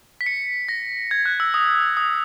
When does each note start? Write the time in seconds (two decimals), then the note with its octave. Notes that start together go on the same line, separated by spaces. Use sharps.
0.21 B6
0.26 C#7
0.69 A#6
1.11 G#6
1.26 F#6
1.40 E6
1.54 D#6
1.97 D#6